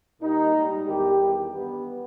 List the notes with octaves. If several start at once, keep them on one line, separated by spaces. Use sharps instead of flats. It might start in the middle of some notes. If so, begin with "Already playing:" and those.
A#2 G3 D#4
G#2 G3
E2 D#3 G3 G4
E2 D#3 G3
G2 G3 B3